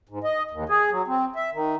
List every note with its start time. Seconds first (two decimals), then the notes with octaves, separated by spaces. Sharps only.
0.09 G#2
0.24 D#5
0.51 D#2
0.69 G#4
0.91 F#3
1.07 C4
1.36 E5
1.53 D#3